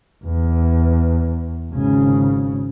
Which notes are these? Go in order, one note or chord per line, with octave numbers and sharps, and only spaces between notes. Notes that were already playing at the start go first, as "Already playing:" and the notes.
E2
G#1 C#3